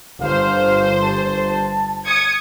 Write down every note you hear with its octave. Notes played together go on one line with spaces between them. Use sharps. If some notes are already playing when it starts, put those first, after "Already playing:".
G1 C5 F5
A5
D#6 G#6 C#7